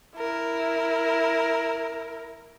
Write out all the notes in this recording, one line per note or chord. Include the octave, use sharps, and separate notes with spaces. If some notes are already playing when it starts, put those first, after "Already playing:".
E4 A#4